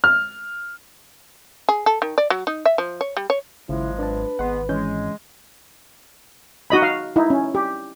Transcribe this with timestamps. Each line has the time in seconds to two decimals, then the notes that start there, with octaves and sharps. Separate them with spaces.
0.04 F6
1.69 G#4
1.86 A4
2.02 D#3
2.18 D5
2.30 F#3
2.47 D#4
2.65 E5
2.78 F3
3.01 C#5
3.17 G3
3.30 C#5
3.69 G#1 C#3 F3 F#3 G#3 E4
3.99 D4 B4 A5
4.39 G#1 G#3 B3 F#5 C6
4.69 E3 G#3 C#4 G6
6.70 D#4 F#4 D#5 B5
6.82 F5
7.16 D#4 E4
7.30 C#4
7.55 G4